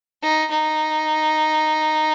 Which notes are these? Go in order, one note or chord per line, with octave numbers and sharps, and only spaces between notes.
D#4
D#4